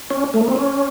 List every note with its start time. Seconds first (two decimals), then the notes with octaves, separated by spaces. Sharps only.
0.10 C#4
0.34 A3
0.41 A#3
0.48 C4
0.56 C#4